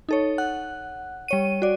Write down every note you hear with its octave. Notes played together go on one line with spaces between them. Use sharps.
D#4 A4 C#5
F#5 F#6
G3 C#5 D#7
F#4 D5